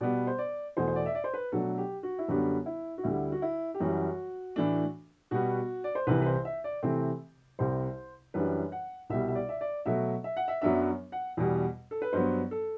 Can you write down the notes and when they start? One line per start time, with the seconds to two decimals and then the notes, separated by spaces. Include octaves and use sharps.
0.01 B2 G3 B3 D5
0.27 C5
0.38 D5
0.77 E2 B2 A3 C5
0.88 C5
0.96 D5
1.06 E5
1.15 D5
1.24 C5
1.34 B4
1.52 B2 F#3 A3 D4 A4
1.78 G4
2.03 F#4
2.19 E4
2.28 F#2 D3 G3 B3 D4 F#4
2.66 E4
2.98 F#4
3.03 D2 D3 G3 E4
3.32 F#4
3.42 E4
3.74 G4
3.80 F#2 E3 G3 F#4
4.56 A2 E3 A3 D4
5.31 B2 G3 B3 F#4
5.84 D5
5.95 C5
6.07 C2 C3 E3 B4
6.22 B4
6.26 C5
6.45 E5
6.64 D5
6.83 C3 E3 A3 C4
7.59 C2 C3 G3 C5
8.34 F#2 E3 G3 D4 B4
8.72 F#5
9.10 C2 B2 G3 E5
9.28 E5
9.35 D5
9.49 E5
9.61 D5
9.86 B2 F#3 A3 E5
10.24 E5
10.37 F#5
10.48 E5
10.61 F#2 F#3 B3 D4 E5
11.12 F#5
11.37 E2 B2 G3
11.91 A4
12.02 B4
12.13 G2 F#3 B3 C5
12.51 A4